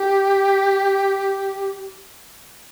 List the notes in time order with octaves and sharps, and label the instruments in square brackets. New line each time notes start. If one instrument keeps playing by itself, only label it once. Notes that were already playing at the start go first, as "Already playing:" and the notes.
Already playing: [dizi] G4